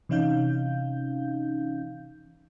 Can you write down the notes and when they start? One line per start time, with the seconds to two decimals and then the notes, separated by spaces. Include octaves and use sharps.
0.09 C3 E3 C#4 D#4 F5 G6